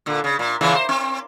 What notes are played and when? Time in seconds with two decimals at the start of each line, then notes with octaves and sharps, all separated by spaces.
0.06 A#2 D3
0.24 C#3
0.39 A#2
0.61 A#2 C#3 E3
0.75 C5
0.89 C4